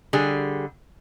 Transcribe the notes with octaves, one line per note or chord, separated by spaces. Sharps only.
D3 G3 G#4